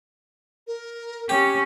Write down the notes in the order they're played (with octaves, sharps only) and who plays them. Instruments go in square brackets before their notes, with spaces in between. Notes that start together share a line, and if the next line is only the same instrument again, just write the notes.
[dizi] A#4
[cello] C#4 [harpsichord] G4